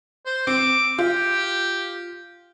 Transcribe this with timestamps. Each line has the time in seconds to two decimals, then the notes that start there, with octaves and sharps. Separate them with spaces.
0.26 C5
0.47 C4 D6
0.99 F4 G4